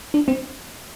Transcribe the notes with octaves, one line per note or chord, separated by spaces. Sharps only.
D4
C4